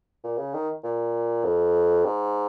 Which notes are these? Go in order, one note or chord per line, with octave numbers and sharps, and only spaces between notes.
A#2
C#3
D#3
A#2
F2
G#2